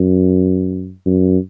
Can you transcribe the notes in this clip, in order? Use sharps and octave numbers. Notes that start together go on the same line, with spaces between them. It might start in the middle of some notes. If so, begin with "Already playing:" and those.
Already playing: F#2
F#2